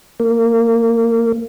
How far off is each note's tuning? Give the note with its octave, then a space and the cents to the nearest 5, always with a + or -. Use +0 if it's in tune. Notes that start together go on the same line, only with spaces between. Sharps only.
A#3 -20